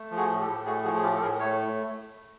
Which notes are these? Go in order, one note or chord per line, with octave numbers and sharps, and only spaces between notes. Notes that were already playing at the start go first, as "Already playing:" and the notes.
Already playing: A3
F3
F#4 G#4
A2
G4 A4
A2
A3 F#4 G#4
F3 F#4 G#4
G#4
A2 F4 G4
A4
A2 G#4 A#4
A3 C#5